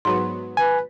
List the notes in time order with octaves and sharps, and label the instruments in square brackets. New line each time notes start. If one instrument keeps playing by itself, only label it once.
[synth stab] G#2 F#3 B3 [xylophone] C6
[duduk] B4 [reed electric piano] G#5